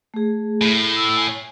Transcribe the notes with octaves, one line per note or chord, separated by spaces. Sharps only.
A3 G#4
A2
E6
G#5